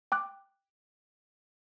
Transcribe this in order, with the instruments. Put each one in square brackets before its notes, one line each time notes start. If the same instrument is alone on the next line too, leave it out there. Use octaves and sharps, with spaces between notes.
[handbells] G5 D6 F#6